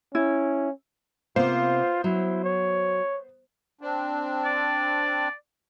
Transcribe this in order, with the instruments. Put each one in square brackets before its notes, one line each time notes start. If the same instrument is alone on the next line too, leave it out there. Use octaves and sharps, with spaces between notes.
[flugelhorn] C#4 [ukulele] E4
[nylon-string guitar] C3 A#3 F5 [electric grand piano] B3 C5 [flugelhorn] F4
[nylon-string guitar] F#3 [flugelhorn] E4
[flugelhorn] C#5
[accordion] C4 D4
[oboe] D5